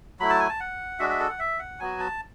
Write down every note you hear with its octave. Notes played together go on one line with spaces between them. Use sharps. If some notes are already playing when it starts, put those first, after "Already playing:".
F#3 A3 E4 B5
A5
G#5
A5
F#5
G#3 D4 F#4 E5
E5
A4
F#5
E5
F#5
F#3 B3 F#4 G#5
A5